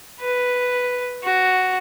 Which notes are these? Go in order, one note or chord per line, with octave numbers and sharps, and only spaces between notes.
B4
F#4